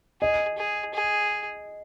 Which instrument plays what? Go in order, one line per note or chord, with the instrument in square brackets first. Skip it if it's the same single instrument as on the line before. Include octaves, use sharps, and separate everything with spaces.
[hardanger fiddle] G#4 [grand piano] D#5
[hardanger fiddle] G#4
G#4